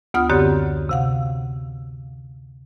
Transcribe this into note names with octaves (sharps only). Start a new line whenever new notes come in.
D2 B3 F4 F#5 D#6 F6
F#2 D3 C4 G4 C#5
C3 F5 F#5